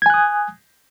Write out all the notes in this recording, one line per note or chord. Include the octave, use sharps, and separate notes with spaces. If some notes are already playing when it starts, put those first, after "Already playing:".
G#5 D#6 F#6 G#6